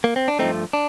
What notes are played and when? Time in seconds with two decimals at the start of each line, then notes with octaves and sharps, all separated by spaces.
0.04 A#3
0.16 C4
0.28 D4
0.39 G2 F3 A3 C4 D#4
0.73 D4